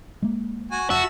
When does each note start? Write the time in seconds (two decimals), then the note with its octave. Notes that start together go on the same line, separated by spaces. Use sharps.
0.22 G#3 A#3
0.71 F#4 G#5
0.90 F1 F#4 E5 A5